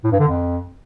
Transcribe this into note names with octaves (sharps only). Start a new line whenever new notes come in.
A2
G2
D3
F2